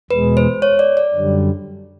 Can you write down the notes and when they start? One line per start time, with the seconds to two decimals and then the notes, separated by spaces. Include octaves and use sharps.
0.11 E2 B2 G#3 B4
0.37 C5
0.62 C#5
0.79 D5
0.97 D5
1.14 F#2 D3 G3